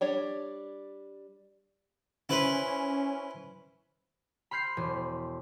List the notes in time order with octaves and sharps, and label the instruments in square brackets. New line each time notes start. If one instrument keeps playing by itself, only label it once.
[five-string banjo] G3 D4 C#5
[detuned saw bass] C#4 [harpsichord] E4 B4 C5
[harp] B5 C6 F6 G6 C7
E1